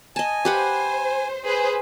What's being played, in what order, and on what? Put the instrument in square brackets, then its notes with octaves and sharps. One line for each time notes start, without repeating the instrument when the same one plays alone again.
[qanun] D#5 A5 [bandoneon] G#5
[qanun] G4 B4 F#5 [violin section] C5
[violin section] G#4 B4 C5